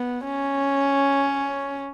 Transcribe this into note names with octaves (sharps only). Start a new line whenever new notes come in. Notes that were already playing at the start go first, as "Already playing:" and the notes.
Already playing: B3
C#4